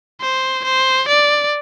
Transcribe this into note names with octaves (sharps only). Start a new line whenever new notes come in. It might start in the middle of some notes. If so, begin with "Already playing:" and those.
C5
C5
D5